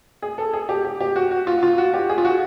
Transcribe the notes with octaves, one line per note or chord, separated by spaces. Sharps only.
G#4
A4
G#4
G4
G4
G4
F#4
F#4
F4
F4
F#4
G4
G#4
F4
F#4